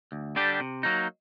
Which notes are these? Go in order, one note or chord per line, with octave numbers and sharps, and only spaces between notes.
D2
D3 G3 D4 G4
C3
F#3 A#3 D#4